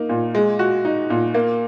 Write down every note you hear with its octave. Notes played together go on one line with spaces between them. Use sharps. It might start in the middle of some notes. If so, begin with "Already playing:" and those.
Already playing: A#3 D#4
A#2
G#3
F#4
D#4
A#2
A#3